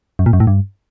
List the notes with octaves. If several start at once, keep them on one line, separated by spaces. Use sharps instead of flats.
F#2
A#2
F#2
A2
G2